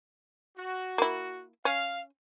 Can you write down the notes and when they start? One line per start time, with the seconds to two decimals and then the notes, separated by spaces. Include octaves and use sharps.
0.58 F#4
0.98 A#3 E4
1.65 C#4 F5